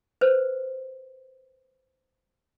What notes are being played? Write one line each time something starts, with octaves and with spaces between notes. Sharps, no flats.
B4 C5